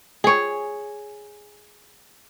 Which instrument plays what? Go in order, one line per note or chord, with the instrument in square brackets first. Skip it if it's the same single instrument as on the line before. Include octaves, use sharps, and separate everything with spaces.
[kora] G#4 C#5